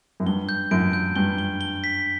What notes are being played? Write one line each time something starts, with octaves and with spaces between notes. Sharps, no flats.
F#2
G2 G7
G6
F#2 D7
G6
G2 G7
G7
G7
B6